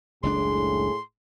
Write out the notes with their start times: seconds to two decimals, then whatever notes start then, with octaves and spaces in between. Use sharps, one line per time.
0.23 F#1 C#2 A2 D4 G#4 C6